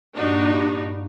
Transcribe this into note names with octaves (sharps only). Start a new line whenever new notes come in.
G2 A#2 D4 D#4 F#4